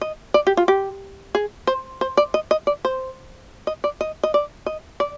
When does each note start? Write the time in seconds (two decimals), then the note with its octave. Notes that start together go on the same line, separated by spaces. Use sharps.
0.01 D#5
0.34 D5
0.47 G4
0.57 F4
0.68 G4
1.35 G#4
1.67 C5
2.01 C5
2.17 D5
2.34 D#5
2.51 D#5
2.67 D5
2.85 C5
3.67 D#5
3.84 D5
4.01 D#5
4.24 D#5
4.34 D5
4.66 D#5
5.00 D5